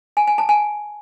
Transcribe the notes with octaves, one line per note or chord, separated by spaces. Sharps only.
G#5
G#5
A5
G#5